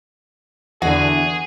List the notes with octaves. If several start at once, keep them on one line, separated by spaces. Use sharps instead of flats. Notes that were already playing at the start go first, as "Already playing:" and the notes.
E2 D3 F#4 G#4